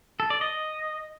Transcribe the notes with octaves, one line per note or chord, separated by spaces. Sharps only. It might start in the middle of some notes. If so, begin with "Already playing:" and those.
A4
D5
D#5